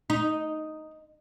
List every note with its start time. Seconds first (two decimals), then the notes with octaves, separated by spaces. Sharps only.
0.10 D#4